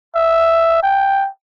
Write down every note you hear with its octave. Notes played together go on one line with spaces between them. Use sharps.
E5
G5